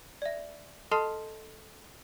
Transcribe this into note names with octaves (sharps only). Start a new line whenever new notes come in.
D5 E5
A4 D#5 A5 C6 F6 C7